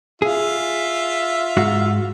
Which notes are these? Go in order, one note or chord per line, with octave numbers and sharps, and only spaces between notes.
F4 G#4 E5
G#2 F#4 F5